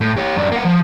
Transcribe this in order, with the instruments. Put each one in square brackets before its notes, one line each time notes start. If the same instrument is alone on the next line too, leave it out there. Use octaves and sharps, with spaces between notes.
[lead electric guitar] A2
G4 C#5
F#2 D4
A#3 F#5
F3